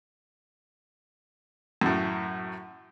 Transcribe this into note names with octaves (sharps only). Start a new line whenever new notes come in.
F#2 A2